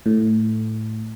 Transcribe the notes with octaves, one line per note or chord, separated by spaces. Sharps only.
A2